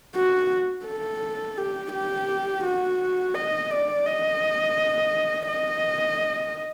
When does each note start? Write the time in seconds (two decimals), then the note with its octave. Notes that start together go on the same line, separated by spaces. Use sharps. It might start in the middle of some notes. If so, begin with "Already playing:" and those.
0.16 F#4
0.86 A4
1.58 G4
1.93 G4
2.65 F#4
3.35 D#5
3.71 D5
4.06 D#5
5.48 D#5